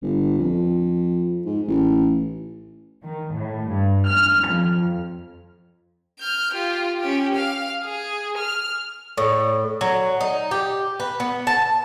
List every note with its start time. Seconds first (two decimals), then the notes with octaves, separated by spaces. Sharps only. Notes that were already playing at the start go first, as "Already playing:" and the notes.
0.02 G1
0.39 F2
1.45 G#2
1.68 A1
3.05 D#3
3.36 A2
3.69 G2
4.09 F6
4.50 F2
6.19 F6 G6
6.53 F4 G4
7.00 C#4 G4
7.35 F5
7.84 G#4
8.37 F6
9.18 A2
9.81 F#3
10.21 D#4
10.51 G4
11.00 B4
11.20 B3
11.47 A5